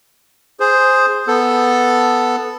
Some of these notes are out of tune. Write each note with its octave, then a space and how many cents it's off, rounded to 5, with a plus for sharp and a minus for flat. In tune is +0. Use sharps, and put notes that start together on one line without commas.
G#4 +0 C5 +0
B3 +0 A4 +0